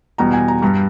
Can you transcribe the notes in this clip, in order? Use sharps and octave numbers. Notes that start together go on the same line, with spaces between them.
E2 B2 G3 A#5
G#5
A#5
G2 G3 A#5